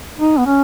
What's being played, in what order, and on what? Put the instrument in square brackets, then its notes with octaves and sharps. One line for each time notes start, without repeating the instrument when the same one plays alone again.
[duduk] D#4
B3
C#4